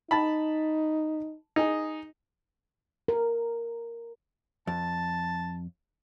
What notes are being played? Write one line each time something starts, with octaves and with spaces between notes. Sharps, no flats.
D#4 A5 B5
D#4 G#4
A#4
F2 A5